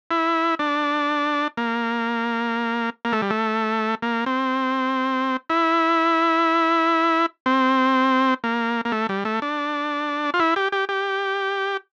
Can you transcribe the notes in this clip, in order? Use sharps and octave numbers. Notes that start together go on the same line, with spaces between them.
E4
D4
A#3
A#3
A3
G3
A3
A#3
C4
E4
C4
A#3
A#3
A3
G3
A3
D4
F4
E4
G4
G4
G4